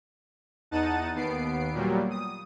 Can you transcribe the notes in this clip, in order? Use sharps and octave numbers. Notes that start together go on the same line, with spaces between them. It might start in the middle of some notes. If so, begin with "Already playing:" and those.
E2 D#4 F#5 A5 A6 D#7
D#2 B3 C7 D7
A#2 F#3 G3
D#6